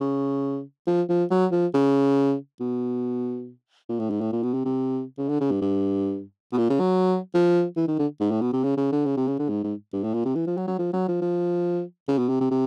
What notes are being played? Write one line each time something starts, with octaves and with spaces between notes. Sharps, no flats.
C#3
F3
F3
F#3
F3
C#3
B2
A#2
A2
G#2
A2
A#2
B2
C3
C3
C#3
D3
C#3
G2
G2
B2
A#2
C#3
F#3
F3
E3
D#3
D3
G#2
A2
B2
C3
C#3
C#3
D3
C#3
C3
C#3
D3
G#2
G#2
G2
A2
A#2
C3
E3
F3
F#3
F#3
F3
F#3
F3
F3
C#3
B2
C3
C3
C3